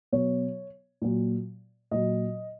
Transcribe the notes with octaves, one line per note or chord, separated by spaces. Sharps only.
B2 F#3 C#5
A#2 F#3
A#2 F#3 D#5